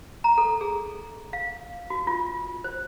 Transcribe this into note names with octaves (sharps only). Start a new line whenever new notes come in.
A#5
A4
G#4
F5
F#4
F4
C5